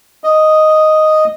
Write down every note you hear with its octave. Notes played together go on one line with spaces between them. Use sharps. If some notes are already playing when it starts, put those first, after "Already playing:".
D#5